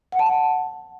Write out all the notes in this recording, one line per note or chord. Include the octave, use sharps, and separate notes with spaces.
F#5
A5
F#5